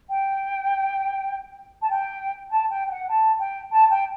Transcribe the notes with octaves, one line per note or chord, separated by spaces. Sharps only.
G5
A5
G5
A5
G5
G5
F#5
A5
G5
A5
G5